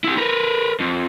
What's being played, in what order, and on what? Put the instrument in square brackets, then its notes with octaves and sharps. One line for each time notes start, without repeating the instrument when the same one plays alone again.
[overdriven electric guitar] E4 G4
A#4 B4
F2